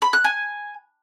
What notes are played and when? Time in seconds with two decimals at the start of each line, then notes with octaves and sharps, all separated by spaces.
0.02 B5
0.13 F#6
0.24 G#5